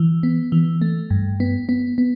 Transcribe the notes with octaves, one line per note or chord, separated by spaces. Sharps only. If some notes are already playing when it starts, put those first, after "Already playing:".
Already playing: E3
B3
E3
A3
G2
B3
B3
B3